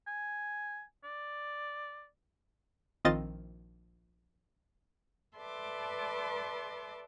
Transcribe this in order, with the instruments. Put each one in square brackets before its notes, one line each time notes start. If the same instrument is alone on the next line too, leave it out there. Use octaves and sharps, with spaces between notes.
[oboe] G#5
D5
[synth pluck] A#1 D#3 C4 F4 D#5 A6
[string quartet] A4 B4 D5 E5 C6 D6